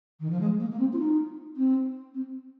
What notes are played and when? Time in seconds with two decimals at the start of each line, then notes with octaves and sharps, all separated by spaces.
0.20 D#3
0.30 F3
0.40 G#3
0.60 A#3
0.72 A#3
0.79 C4
0.93 F4
0.99 D#4
1.56 C4
2.14 C4